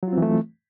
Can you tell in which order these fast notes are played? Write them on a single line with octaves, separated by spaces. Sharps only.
F#3 F4 C4 E3 A3